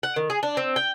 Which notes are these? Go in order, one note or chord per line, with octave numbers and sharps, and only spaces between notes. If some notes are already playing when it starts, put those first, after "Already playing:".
F#5
D#3
G#4
D4
C4
G5